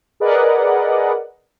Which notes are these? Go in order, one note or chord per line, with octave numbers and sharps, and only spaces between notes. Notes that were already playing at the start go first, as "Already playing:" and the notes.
G#4 A#4 B4 D5 D#5 F#5